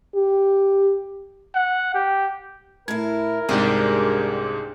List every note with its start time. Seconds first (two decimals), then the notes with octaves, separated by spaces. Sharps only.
0.15 G4
1.55 F#5
1.94 G4
2.88 A2 E4 A#4 G#6
3.49 C2 G#2 G#3 C4 D4 G4 G#4